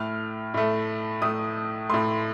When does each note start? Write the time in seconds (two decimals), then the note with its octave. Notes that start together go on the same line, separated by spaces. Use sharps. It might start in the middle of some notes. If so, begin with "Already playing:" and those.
Already playing: A2 A3 F6
0.54 A2 A3
1.22 A2 A3 D#6
1.90 A2 A3 C6